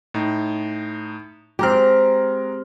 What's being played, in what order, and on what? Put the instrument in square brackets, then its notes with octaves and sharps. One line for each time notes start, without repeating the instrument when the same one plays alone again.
[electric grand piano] A2 D#4
[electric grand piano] G#3 A#5 F6 [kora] C4 G4